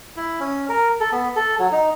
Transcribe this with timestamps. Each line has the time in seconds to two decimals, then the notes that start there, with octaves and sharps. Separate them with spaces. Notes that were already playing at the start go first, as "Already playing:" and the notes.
0.17 E4
0.40 C#4
0.69 A#4
1.00 A4
1.12 B3
1.36 A4
1.59 F#3
1.72 D#4